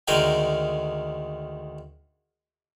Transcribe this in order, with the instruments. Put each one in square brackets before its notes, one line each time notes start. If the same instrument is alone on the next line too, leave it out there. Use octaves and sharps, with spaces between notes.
[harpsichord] D2 D#3 G#3 A#4 G5 G#5